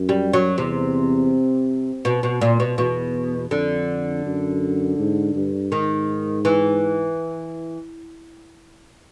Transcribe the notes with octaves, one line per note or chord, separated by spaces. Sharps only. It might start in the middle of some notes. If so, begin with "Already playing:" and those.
Already playing: F#2
G3
F#3
E2 C3
B2
B2
A#2
B2
E2 B2
F2 D3
F#2
G#2
G2
G#2 D#3
E3